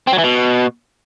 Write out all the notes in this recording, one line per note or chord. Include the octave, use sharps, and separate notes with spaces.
C4
F#3
E3
B2